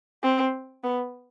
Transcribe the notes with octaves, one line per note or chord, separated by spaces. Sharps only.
C4
B3